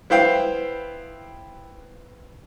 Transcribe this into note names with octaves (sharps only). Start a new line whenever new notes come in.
B3 E4 C5 F5 G5